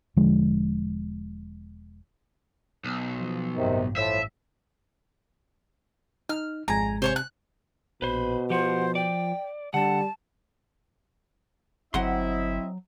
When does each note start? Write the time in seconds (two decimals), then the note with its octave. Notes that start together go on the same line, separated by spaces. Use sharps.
0.16 E1 D3 F3 G#3
2.84 B1
3.17 F3
3.55 A1 G2 C3 D#3
3.96 A2 F3 E5
6.29 D#4 F6
6.68 G#1 F2 G#3 G#5 A#5
7.02 C3 C5 C#5 C#6
7.16 F#6
8.02 A#1 B2 B4 C5 B5
8.50 F3 G4 C5 F#5
8.95 D5 G5
9.74 D3 G3 F#5 A5
11.94 G1 F#3 C4 E4 D#5 E5 F#5 C6